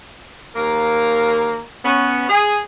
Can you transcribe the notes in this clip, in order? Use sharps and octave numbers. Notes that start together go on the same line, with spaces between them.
D#2 A#3 A#4
B3 C#4
G#4